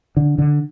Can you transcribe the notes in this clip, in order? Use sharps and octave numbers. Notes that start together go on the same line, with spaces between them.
D3
D3